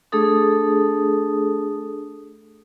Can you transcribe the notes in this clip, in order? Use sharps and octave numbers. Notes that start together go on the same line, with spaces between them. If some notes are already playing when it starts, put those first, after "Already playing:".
A3 D4 G#4 A4 D#6